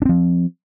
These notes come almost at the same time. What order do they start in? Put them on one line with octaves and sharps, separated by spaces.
D4 C4 F3